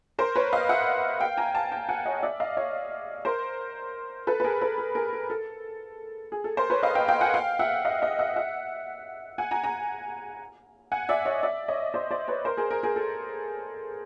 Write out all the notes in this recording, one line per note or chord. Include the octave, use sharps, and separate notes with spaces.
A#4 C5
B4 C#5
D#5 F5
E5 F#5
F5 G5
G#5 A#5
G5 A5
G5 A5
F#5 G#5
C#5 D#5
D5 E5
D#5 F5
C#5 D#5
A#4 C5
A4 B4
B4
G#4 A#4
A4 B4
A4
G#4 A#4
A4
A4
G#4
A4
A#4 C5
B4 C#5
D#5 F5
F5 G5
F5 G5
F#5 G#5
F5 G5
E5 F#5
D#5 F5
D#5 F5
E5 F#5
E5 F#5
F#5 G#5
G#5 A#5
G#5 A#5
F#5 G#5
D5 E5
C#5 D#5
D5 E5
C#5 D#5
C5 D5
C5 D5
B4 C#5
A#4 C5
G#4 A#4
G#4 A#4
G#4 A#4
A4